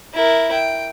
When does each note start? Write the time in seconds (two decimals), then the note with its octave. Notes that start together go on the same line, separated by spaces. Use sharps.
0.14 E4 A#4
0.52 G5